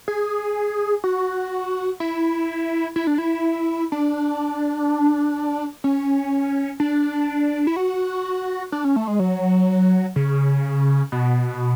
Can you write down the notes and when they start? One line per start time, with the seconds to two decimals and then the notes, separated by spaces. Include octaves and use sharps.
0.08 G#4
1.04 F#4
2.00 E4
2.96 E4
3.07 D4
3.18 E4
3.92 D4
5.84 C#4
6.80 D4
7.67 E4
7.76 F#4
8.72 D4
8.84 C#4
8.96 A3
9.07 G#3
9.19 F#3
10.16 C#3
11.12 B2